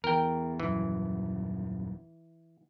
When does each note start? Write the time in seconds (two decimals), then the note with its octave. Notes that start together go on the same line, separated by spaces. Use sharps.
0.04 E2 A#4 G5
0.60 D#1 F#2 E3